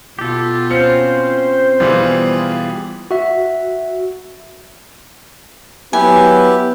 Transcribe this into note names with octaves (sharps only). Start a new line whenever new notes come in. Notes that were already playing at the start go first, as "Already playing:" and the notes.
B2 F4 G4 A4
C4 C#4 C5 F5 C#7
B2 E3 G3 F4 G#4
F#4 E5
F#3 B3 E4 G4 B4 G#5